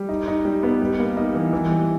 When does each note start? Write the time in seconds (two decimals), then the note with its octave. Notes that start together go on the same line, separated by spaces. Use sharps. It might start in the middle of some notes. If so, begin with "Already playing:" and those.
Already playing: G3
0.09 D#4
0.28 D#4
0.45 G3
0.63 B3
0.81 G3
0.99 A#3
1.17 D#4
1.34 E3
1.53 E3
1.70 G3